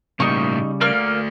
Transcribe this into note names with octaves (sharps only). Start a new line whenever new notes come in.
A2 C#3 G3 A#3 D#4 C#6
A3 A#3 D5 F6